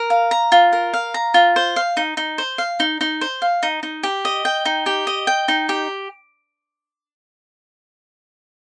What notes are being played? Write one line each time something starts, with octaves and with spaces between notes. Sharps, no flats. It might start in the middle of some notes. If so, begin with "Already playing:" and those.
Already playing: A#4
F5
A#5
F4
A#4
F5
A#5
F4
C5
F5
D#4
D#4
C5
F5
D#4
D#4
C5
F5
D#4
D#4
G4
D#5
G5
D#4
G4
D#5
G5
D#4
G4